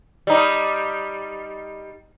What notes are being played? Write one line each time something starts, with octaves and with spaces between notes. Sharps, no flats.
G3 D#4